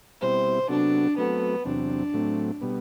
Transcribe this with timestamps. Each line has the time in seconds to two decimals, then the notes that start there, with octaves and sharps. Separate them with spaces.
0.21 B2 G3 C4 E4 C5
0.69 C3 F#3 B3 D4 F#4 A4
1.18 F#3 A3 B3 C4 F#4 A4
1.65 E2 C3 F#3 C4 D4
2.13 A2 F#3 A3 C4
2.61 B2 G3 B3